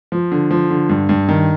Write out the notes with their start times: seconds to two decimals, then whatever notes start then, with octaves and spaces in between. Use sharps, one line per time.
0.12 F3
0.32 D3
0.51 F3
0.70 D3
0.89 G2
1.09 G2
1.29 D#3